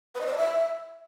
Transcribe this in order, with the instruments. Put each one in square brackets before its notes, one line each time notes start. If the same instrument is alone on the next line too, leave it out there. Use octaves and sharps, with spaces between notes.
[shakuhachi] B4
D#5
C5
D5
E5